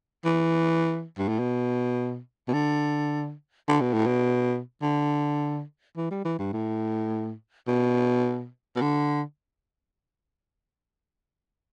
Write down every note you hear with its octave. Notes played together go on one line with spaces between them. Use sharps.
E3
G2
A2
B2
B2
D3
D3
B2
A2
B2
D3
E3
G3
E3
G2
A2
B2
B2
D3